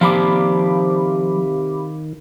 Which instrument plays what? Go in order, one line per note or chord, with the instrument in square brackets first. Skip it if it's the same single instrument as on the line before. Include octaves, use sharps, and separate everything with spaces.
[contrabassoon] C3 [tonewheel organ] D#3 [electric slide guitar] F3 D5 [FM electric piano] F5 B5 D6